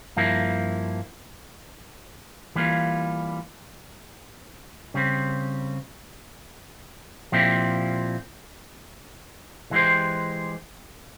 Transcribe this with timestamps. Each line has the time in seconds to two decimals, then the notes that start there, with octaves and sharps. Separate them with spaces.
0.16 G2 F3 A#3 E4
2.55 E3 G3 A#3 F4
4.94 C#3 G3 C4
7.32 A#2 F3 C4 E4 G4
9.71 E3 G#3 E4 G4 C5